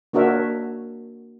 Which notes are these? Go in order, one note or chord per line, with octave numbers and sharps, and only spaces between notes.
A#3 D4 F#4 A#4 C#5 E5